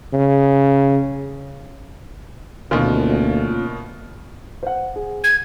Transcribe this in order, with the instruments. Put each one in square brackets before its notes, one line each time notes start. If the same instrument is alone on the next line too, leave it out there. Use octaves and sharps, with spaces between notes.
[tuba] C#3
[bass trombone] D2 [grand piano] B2 D#3 [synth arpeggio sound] A#3 C#4 F4
[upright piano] C5 F#5
G#4
[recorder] G#6